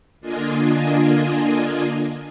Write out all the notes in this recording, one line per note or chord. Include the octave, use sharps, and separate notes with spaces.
D3 A#3 D4 F4 D#5 G#5